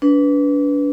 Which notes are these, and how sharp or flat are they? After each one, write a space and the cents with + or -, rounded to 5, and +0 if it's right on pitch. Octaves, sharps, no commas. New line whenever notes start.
D4 -35 B4 +0